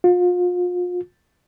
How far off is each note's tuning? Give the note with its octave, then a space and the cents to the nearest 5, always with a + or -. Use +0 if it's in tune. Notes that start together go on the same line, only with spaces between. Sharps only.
F4 +35